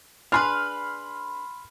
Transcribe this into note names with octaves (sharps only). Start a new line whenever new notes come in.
D4 G#4 B4 B5 C6 F6